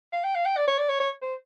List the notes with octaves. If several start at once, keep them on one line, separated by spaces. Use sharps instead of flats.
F5
G5
F5
G5
D5
C#5
D5
C#5
C#5
C5